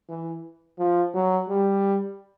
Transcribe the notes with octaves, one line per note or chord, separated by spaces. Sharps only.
E3
F3
F#3
G3